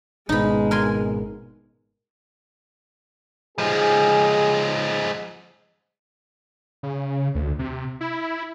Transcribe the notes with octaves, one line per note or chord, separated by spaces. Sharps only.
G#1 B2 G#3 D#4 B5
A#4 G#5 C6
F3 G#3 G4 G#4
C#3
D2
C3
E4